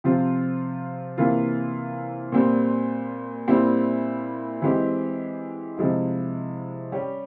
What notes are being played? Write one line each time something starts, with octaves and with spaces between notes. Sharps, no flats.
C3 F3 C4 F4
C3 E3 A#3 F4
A#2 G3 C4
A#2 G3 C4 E4
E3 G#3 C4 G4
C3 F3 G#3 E4
G3 C#4 G4